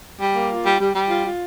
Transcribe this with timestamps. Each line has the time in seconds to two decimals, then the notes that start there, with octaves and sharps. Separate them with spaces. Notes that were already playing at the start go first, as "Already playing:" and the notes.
0.19 G3
0.35 A#3
0.50 F4
0.65 G3
0.80 G3
0.94 G3
1.09 F4
1.25 F4